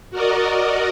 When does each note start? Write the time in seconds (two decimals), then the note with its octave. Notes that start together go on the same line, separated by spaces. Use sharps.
0.11 F#4 A#4 D5 D#5